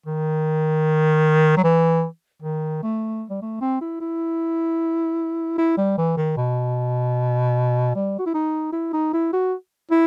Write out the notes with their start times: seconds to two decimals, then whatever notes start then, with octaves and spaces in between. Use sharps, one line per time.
0.06 D#3
1.57 F#3
1.64 E3
2.42 D#3
2.83 A3
3.30 G3
3.42 A3
3.61 C4
3.81 E4
4.00 E4
5.58 E4
5.77 G3
5.97 E3
6.17 D#3
6.37 B2
7.95 G3
8.19 F#4
8.26 E4
8.34 D#4
8.73 E4
8.93 D#4
9.13 E4
9.33 F#4
9.91 E4